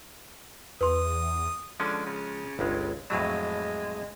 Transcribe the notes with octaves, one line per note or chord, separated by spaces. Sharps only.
E2 B4 C6 D#6
D3 F3 G#3 C#4
C#3
G1 C#2 G#3
F2 A2 F#3 G#3